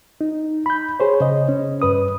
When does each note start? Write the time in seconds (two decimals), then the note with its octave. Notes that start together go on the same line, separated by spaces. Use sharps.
0.21 D#4
0.66 B5 G6
1.00 G#4 C5 C#5
1.21 C#3 D#5
1.49 C#4
1.82 G2 B4 D#6